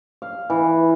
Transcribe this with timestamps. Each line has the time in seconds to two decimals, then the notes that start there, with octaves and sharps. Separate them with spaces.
0.22 F5
0.50 E3